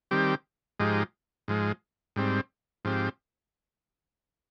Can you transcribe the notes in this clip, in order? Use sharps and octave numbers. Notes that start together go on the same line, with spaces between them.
D#3 G3 C4 G4
G#2 F3 G#3 D#4 G4
G#2 F3 G#3
G#2 G3 C4
G#2 F3 C4 G4